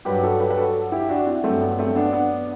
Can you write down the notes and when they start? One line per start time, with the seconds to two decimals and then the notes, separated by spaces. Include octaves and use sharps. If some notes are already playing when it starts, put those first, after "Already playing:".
0.05 G2 F#3 G4 B4
0.23 F#4 A4
0.40 G4 B4
0.50 B4
0.57 F#4 A4
0.92 E4 G4
1.09 D4 F#4
1.27 C4 E4
1.43 G2 F#3 A3 C4
1.61 B3
1.79 A3 C4
1.96 B3 D4
2.13 B3 D4